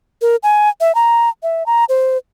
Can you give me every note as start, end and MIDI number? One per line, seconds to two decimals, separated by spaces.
0.22 0.36 70
0.43 0.69 80
0.81 0.95 76
0.95 1.29 82
1.43 1.66 76
1.66 1.85 82
1.89 2.17 72